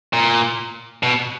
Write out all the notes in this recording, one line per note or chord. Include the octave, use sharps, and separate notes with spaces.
A#2
B2